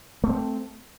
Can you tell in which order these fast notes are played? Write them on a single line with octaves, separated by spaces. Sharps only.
A3 A#3 C4